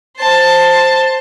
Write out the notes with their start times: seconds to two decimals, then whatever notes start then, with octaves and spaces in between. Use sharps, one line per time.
0.17 C5 A5